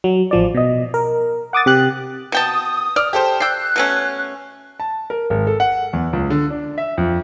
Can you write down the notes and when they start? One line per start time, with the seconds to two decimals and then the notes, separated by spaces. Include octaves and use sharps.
0.04 F#3
0.31 A1 F3 D5
0.54 B2 D#5
0.94 A#4
1.53 F#5 D6 D#6 A6
1.66 C3 G4 F#6
2.32 B2 G5 A5 D#6
2.96 D5 F6
3.13 G4 A4 C5
3.40 D5 G5 E6 F#6 C7
3.76 B2 A3 C#4
4.80 A5
5.10 A#4
5.30 G#1
5.47 A4
5.60 F#5
5.93 E2
6.13 C#2
6.30 D3
6.50 D4
6.78 E5
6.98 F2